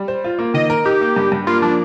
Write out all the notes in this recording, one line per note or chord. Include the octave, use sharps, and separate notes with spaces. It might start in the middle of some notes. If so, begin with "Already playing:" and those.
Already playing: G3
C5
F4
A#3
D#3 D#5
A#4
D#4 G4
A#3
G2
G2
A#3 F4
F3 D4